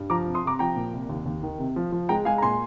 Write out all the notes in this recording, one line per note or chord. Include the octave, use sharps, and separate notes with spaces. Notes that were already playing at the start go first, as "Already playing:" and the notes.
Already playing: G2
F3 A#5 D6
C3
C6 D#6
C3 A#5 D6
F3 G5 A#5
A#2
C2
D#2
D#2
D#3
C3
F3
F3
G#3 G5 A#5
G#3 F5 G#5
A#5
A#2 G#5 C6